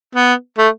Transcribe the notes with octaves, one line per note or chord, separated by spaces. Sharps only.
B3
A3